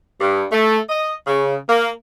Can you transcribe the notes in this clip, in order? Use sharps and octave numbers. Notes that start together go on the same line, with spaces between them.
G2
A3
D#5
C#3
A#3